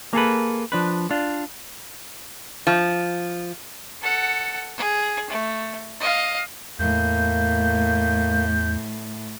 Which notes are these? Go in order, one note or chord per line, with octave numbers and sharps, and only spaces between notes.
A#3 G#4 A4 B4
F3 D4 B4
D4 F4
F3
A4 F#5
G#4
A3
D#5 F5
E2 A2 A#3 G6